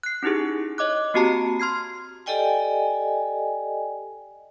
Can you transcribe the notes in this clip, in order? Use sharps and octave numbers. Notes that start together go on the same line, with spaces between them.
F#6 C7
C#4 D#4 E4 G4 G#4
C#5 D#5 D6 F#6
A#3 C4 F#4 G4 A5 A#5
C6 F6 G#6 C7
G4 A4 D5 D#5 G5 G#5